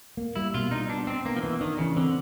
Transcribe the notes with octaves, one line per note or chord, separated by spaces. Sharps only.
A#3
G3 E4
B2 F4
D4 D#4
B3 D4
C4 D4
A#3 B3
F3
E3 B3
D#3 D4
C#3 E3
D3 C4